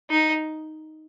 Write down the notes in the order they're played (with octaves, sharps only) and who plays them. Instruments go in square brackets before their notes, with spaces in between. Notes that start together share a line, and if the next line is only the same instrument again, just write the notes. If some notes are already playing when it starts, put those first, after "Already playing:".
[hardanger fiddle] D#4